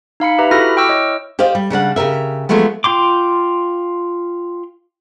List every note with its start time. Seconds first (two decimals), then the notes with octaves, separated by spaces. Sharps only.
0.20 D#4 F5 B5 C#7
0.38 G4 B4 E5 A#5
0.51 E4 F#4 A4 B5 F6 A#6
0.77 G5 C#6 D6 E6 F6
0.89 E4 C#5 D#5
1.39 G4 C5 D5 D#5 F5
1.55 G3
1.70 C#3 G3 D4 F#5
1.96 C#3 G4 A#4 E5
2.49 F3 F#3 G#3 A3 B3
2.84 F4 G5 C6 D6